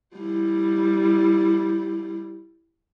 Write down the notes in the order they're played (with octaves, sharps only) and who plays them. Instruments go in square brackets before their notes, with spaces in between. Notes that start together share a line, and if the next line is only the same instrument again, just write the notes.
[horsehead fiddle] G3 E4